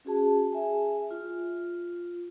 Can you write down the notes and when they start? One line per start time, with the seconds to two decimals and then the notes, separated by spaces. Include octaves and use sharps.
0.05 C#4 F#4 G#4 A5
0.53 G#4 E5 G#5
1.11 F4